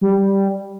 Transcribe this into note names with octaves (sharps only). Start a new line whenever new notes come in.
G3